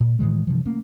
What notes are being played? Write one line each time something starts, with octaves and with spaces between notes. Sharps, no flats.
A#2
A2 D#3 E3 G#3
G2 C3 E3 F3
A3 A#3 C#4